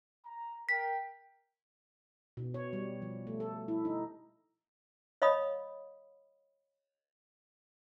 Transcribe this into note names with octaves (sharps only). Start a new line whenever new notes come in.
A#5
A#4 G5 B6
B2
C#5
G3
F3
A3
A4
E4
D#4
C#5 D#5 F5 B5 D#6